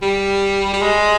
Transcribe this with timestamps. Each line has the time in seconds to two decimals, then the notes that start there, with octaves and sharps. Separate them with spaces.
0.02 G3
0.73 G3
0.82 G#3